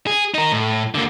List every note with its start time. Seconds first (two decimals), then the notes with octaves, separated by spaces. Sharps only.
0.07 G#4
0.34 D#4 A#4
0.52 A2
0.95 D3 A#3